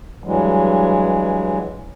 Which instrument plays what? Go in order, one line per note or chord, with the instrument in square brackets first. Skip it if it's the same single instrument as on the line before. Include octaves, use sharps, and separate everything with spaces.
[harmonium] G2 E3 F#3 G#3